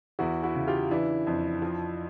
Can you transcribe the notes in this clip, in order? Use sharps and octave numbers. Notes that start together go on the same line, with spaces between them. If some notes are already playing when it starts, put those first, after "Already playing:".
E2 E4 F#4
E4 F#4
C#3
F4 G4
E3 D4 E4
F2
F3